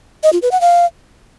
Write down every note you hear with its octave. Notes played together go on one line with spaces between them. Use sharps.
D#5
F4
B4
F#5
F5